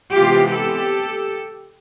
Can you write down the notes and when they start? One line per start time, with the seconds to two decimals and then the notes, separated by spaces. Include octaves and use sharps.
0.13 C3 E3 G#3 B3 F4 G4
0.52 G4 A4